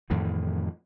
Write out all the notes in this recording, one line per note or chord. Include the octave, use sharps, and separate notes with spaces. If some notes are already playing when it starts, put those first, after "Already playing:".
F2 A2 D#3 E3